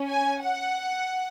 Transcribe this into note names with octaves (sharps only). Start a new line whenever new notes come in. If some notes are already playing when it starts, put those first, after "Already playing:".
Already playing: C#4
G#5
F#5